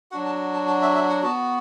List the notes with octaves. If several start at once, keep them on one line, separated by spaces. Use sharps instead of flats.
F#3 D4 F#4 F#5
A5
A5
A5
E5
E5
F#5
B3 F#4 A5